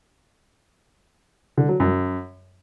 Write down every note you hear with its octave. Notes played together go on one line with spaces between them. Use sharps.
D3
F#3
F#2